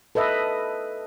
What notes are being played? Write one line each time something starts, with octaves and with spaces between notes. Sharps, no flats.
A4 B4 D#5 E5